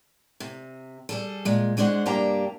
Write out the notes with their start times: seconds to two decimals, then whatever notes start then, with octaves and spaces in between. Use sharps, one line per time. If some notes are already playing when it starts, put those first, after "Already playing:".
0.40 C3
1.09 G3 G#4 A4
1.45 A#2 G#3
1.77 B2 G#3 D4 C5 F#5
2.06 G2 C3 A#3 D4 G4 A#5